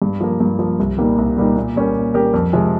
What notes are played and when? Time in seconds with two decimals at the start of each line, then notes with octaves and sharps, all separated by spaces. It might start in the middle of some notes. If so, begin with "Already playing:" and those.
0.02 G2
0.21 F3 A#3
0.40 G2
0.59 F3 A#3
0.79 C2
0.98 A#2 G3 A#3 D#4
1.18 C2
1.37 A#2 G3 A#3 D#4
1.56 A#2
1.76 G3 C#4 G4 A#4
1.95 A#2
2.14 G3 C#4 G4 A#4
2.34 F2
2.53 C3 F3 G#3